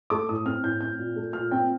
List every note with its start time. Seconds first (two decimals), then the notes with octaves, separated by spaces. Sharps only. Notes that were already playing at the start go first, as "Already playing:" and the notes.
0.10 A3 D6
0.29 A2 D#6
0.45 C4 F6
0.63 A2 G6
0.81 C4 G6
0.98 A#2
1.16 A3
1.33 A#2 F6
1.51 C4 G5